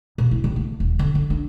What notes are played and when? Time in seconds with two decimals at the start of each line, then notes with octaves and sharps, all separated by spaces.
0.18 A#2
0.31 E4
0.44 D#3
0.56 A3
0.80 D#1
0.99 D3
1.15 D3
1.30 D4